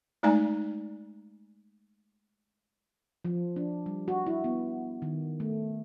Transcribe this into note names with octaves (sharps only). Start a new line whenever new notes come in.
G#3 A3 D#4 D5 G#5 A#5
F3
D4
G3
F#4
E4
B3
D#3
A3